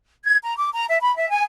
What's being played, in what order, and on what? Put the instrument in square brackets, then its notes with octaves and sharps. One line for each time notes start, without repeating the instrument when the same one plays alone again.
[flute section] G#6
A#5
D6
A#5
E5
B5
E5
G#5